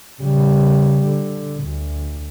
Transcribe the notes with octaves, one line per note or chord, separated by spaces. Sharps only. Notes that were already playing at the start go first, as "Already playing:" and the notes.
C#3 G3
D3
D2